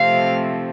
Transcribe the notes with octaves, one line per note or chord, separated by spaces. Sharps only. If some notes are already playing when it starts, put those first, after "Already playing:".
Already playing: C3 F3 A3 C4 F5